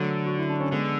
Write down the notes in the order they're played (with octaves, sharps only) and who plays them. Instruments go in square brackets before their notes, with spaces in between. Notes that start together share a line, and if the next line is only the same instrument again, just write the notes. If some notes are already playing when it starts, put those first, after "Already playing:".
Already playing: [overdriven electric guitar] D3 [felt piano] F#3 A3
[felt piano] F#4
E4
D4
C#4
[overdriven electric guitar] D3 [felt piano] G#3 B3